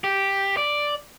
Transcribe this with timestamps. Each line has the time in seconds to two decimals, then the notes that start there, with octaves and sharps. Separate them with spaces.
0.04 G4
0.57 D5